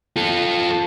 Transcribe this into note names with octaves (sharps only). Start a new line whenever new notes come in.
F4 A4